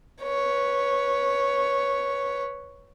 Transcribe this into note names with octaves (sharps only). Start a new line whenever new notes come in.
B4 C#5